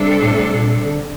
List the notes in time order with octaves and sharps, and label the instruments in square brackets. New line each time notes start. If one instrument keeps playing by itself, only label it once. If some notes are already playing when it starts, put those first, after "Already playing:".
Already playing: [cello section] C3 G3 D4 A4
[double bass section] A2
A#2
D3